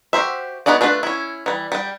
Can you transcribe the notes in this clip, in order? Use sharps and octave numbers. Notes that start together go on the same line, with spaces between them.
F#4 G4 C5 E5
G#3 B3 D#4 F#4 D5
A3 D4 F4 G#4 B4
C#4 E4
E3 G3
G3 G5